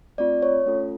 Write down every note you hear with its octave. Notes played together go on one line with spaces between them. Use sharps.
A3 C4 F4 D5
C#5
A3 C#4 F4 A4